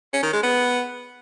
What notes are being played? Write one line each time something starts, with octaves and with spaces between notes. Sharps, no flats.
C#4
D#3
G#3
B3